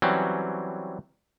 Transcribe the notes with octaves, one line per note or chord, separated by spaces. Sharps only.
E3 F#3 G3 C4 C#4